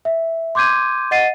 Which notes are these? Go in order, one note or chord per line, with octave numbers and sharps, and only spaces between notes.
E5
C6 D6 G6 G#6 D#7
D#5 F#5 A6 C7 D#7